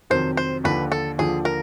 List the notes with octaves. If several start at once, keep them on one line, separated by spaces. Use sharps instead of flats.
F2 C3 D#3 F#3 C5
C5
D#2 D3 F3 B4
A4
D#2 D3 F3 G#4
A#4